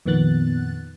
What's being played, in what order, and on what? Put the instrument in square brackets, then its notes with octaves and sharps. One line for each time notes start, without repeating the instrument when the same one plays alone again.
[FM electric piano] F2 A#2 D#3 B3 F#6 A6